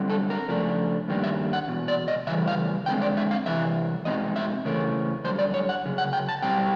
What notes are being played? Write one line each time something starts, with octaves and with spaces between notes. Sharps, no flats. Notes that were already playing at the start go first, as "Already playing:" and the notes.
Already playing: F#2 D3 G3 C4
A4
A#4
C#3 F3 A3 D4
G2 D#3 G3 A#3 D4
E5
F#5
E2 B2
D5
D#5
C#3 E3 G3 E5
F5
D3 F3 G#3 C4 G5
D5
E5
F5
C3 E3 E5
B2 G#3 C4 D#4 D#5
E5
C#3 E3 A3 C#4 A#4
F#2 D3 G3 C5
D5
C#5
F#5
F#2 C#3
F#5
G5
A5
B2 G3 C4 G5